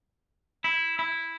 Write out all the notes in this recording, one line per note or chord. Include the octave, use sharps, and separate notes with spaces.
E4
E4